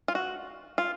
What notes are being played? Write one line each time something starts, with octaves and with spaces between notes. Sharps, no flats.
F4
F#4
F4